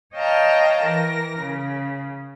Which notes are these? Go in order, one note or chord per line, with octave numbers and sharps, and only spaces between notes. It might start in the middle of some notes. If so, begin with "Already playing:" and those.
C#5 D#5 F5 G5 A5 A#5
E3 A#4 A#6
C#3